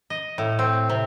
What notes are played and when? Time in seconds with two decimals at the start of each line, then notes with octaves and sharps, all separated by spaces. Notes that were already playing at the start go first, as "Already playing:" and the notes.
0.10 D#5
0.38 A2
0.59 C4
0.90 C3